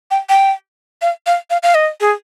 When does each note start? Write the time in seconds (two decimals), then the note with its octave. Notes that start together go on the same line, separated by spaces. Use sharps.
0.11 G5
0.29 G5
1.02 F5
1.26 F5
1.50 F5
1.63 F5
1.75 D#5
2.01 G#4